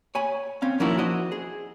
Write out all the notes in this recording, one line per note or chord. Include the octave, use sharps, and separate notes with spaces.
C#5 G#5 B5
C4 C#4 F5
F3 A#3 C#4 D#4 E4 F#4
F#4 C5 D#5
G#4